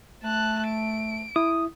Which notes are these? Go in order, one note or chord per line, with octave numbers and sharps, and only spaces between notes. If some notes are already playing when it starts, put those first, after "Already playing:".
A3 A5 F#6
D7
E4 D#6